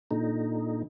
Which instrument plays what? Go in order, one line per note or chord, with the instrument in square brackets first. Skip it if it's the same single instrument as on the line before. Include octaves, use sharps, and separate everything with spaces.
[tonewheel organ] A#2 D3 D#4